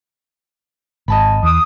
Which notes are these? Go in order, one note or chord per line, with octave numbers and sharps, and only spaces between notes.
G#1 D#5 A5 B5
E2 D#6